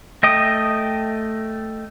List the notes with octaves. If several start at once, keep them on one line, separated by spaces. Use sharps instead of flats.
A3 D#5 G5 D#6